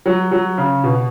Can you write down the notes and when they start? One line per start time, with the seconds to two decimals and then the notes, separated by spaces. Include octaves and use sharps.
0.06 F#3
0.31 F#3
0.58 C#3
0.84 B2